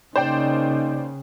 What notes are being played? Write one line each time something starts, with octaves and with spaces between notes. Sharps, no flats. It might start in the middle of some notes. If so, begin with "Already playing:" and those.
C#3 A#3 D#4 C5 D5 G5